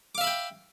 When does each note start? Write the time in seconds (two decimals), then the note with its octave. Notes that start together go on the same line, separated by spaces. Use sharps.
0.15 D6
0.18 F5
0.21 E5
0.24 B5
0.27 G5